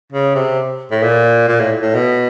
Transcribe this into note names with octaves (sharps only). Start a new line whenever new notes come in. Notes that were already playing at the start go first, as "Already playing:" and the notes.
C#3
C3
A2
A#2
A#2
A2
A2
B2